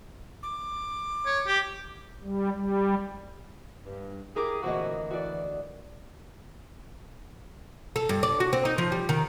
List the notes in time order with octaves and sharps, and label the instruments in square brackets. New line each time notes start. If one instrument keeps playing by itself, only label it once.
[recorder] D6
[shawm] C#5
G4
[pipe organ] G3
G3
[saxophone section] G2
[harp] E4 A#4 D6 [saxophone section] G4 G#4
[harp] D2 E3 D#5 [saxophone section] A#2 C4 F#4
[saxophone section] E3 [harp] F#4 D5
[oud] A4
G2
D5
F#4
C4
D#4
F3
G3
D#3